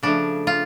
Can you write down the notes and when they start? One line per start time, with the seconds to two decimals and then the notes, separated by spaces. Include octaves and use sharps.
0.03 C#3 F3 A3 D4
0.47 F4